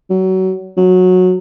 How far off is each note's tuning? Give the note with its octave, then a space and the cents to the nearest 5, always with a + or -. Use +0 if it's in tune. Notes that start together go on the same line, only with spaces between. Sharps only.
F#3 +25
F#3 -15